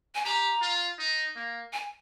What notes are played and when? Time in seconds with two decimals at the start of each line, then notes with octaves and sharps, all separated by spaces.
0.15 G#5
0.25 G4 A#5
0.62 F4
0.99 D#4
1.36 A#3
1.73 G#5